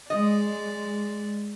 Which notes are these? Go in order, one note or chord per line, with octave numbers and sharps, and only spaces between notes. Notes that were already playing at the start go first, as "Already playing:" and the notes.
G#3 D5 D#5